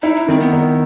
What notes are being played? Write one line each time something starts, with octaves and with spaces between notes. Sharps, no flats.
D#4 E4
D#4
D#3 C4
B3
D#3